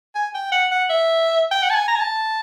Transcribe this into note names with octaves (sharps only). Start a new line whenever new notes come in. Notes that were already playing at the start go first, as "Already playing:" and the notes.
G#5
G5
F#5
F#5
E5
G5
F#5
A5
G#5
A#5
G#5
A5